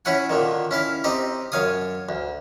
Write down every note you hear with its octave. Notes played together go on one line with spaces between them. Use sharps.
C#4 E4 C#5 F#5 G#5
A#2 D3 D#3
C#4 E4 F5
C4 D#4 G4 D#5
F#2 C#5 F5 G#5 D#6
D2